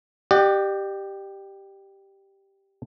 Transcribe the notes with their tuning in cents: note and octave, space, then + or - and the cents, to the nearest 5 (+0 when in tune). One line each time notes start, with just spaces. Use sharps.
G4 +0 D5 +45 F#5 +0